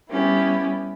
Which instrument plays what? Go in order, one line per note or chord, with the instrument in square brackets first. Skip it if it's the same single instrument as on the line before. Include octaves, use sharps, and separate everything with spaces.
[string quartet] G3 B3 C#4 E4 G4